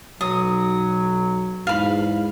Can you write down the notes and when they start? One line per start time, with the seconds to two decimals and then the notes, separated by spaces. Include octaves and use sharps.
0.21 B1 F#3 D#6
1.67 E2 G#2 F5 B5